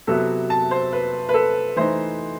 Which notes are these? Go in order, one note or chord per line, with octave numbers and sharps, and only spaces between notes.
C3 F#3 B3 E4 A4
A5
C5
B4
B4
A4
E3 A3 D#4 C5